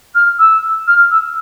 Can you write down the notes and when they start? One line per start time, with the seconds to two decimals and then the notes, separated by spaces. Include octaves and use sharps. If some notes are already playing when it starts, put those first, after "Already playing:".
0.14 F6
0.39 E6
0.87 F6
1.11 E6